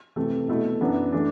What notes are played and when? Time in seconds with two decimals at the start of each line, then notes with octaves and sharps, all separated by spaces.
0.16 C3 E3 A3
0.48 B2 A3 E4
0.81 F#2 E3 B3 D4
1.12 E3 A3 D4